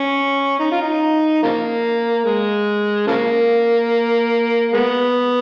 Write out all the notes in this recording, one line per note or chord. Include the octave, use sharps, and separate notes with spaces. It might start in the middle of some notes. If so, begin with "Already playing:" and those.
Already playing: C#4
D#4
F4
D#4
C#3 F3 A#3
G#3
C#3 F3 A#3
G#3 B3